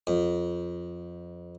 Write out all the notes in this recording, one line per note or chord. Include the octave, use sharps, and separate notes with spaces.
F2